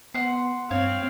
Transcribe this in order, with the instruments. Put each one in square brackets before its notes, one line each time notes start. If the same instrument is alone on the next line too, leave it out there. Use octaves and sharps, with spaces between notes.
[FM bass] B3 [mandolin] F#5 C6
[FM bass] G2 [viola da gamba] C4 [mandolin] C#5 [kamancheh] F5